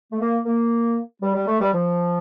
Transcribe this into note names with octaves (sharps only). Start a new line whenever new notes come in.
A3
A#3
A#3
G3
G3
A3
G3
F3